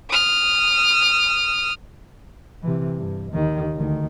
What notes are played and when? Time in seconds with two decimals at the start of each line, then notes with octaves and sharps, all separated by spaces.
0.10 D#6 F6
2.63 C3 E3
2.97 G2
3.32 D#2 D#3
3.76 D2 D#3